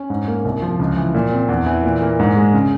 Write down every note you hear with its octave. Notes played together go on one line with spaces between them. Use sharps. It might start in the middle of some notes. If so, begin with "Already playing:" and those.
Already playing: C#4
G#2
A#3
C2
F3
C#2
E3
A#2
C4
E2
E3
A#2
A#3
G#2
G#3
C#3